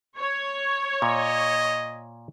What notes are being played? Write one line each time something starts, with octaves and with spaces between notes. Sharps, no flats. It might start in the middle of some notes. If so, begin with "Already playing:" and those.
C#5
A#2 D#5